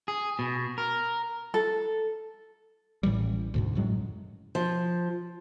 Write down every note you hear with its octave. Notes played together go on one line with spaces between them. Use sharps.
G#4
B2
A#4
A4
A1 A2 E3 G3
D2 G#2 B2
F#2 A2 F#3 G#3
F3